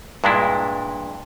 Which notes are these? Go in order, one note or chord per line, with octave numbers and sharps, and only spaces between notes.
G2 A#2 G#3 D4 E4